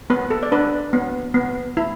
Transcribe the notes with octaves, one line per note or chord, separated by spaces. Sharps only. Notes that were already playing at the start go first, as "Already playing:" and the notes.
B3 B4
A4
D5
D4 B4
B3
B3
E4